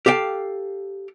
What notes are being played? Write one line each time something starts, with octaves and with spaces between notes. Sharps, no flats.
G4 A4 F5 G5